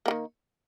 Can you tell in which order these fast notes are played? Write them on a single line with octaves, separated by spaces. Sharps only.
A#3 F3 D#3